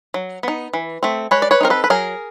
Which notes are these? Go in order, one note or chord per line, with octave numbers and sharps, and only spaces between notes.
F#3
B3 D#4
E3
A3 C4
G#3 B4 C#5
D5
B4 C#5
C4 D#4 A#4
A4 B4
B4
F#3 G#4 A#4